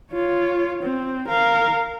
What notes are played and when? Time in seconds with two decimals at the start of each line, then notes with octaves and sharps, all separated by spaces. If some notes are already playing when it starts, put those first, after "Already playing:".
0.12 F4 C#5
0.83 C4
1.28 A#4 F5